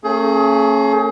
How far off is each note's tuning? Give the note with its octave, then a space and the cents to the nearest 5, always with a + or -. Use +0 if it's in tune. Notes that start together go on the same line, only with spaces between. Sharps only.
A3 +40 C#4 -25 G#4 +30